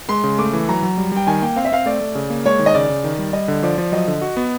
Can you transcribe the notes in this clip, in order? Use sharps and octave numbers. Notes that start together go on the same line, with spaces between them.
G#3 C6
C#3
A3 D6
E3
F#3 A#5
F#3
G3
G3 G5
D#3 G#5
A#3 G5
C4 F5
E5
C4 F5
A3 D5
A3
C#3
A#3
G#3 C#5
D#3
D#5
C#3 D5
C#3
D#3
G3
G3 D#5
D3
F3 D5
F3 D5
F#3 D#5
D3
F#4
B3